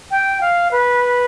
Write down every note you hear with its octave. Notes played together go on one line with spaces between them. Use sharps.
G5
F5
B4